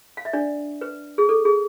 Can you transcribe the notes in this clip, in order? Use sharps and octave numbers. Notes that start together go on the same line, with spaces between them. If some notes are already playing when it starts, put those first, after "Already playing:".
F5
E5
D4 D5
B4
G#4
A4
G#4